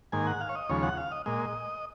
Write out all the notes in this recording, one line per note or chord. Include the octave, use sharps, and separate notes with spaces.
G#2 D#3 A#3 G#5
F#5
F5
C#5
D#5
D#2 C#3 F3 G#3 C#5
F#5
F5
D#5
A#2 G#3 D#5